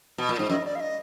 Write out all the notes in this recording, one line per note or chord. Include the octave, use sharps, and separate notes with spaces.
B2
A#2
G#2
F#2 D#5
D5
F5
D#5